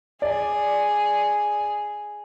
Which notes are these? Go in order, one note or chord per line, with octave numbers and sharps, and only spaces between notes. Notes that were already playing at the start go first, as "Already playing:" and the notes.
G#4 D5